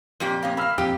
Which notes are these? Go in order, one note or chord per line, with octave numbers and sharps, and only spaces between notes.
F2 A#2 G4
A#3 C#4 D#4
A#3 F5 B5 E6 F6
F2 A#2 G4